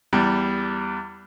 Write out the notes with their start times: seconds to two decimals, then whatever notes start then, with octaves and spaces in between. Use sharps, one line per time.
0.13 E2 G3